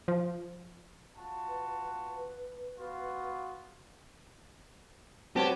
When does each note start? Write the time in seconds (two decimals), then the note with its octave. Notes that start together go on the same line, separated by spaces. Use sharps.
0.08 F3
1.16 F4 F#4 A5
1.48 B4
2.78 B3 F4 F#4
5.36 G3 C4 F#4 G4 B4 C#5 A5